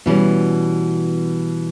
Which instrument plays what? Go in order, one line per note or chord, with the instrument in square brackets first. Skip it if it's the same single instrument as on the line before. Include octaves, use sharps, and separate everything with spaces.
[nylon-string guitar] B2 E3 G3 C#4